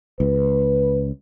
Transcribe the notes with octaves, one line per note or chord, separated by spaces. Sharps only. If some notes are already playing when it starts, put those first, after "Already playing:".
C#2 B4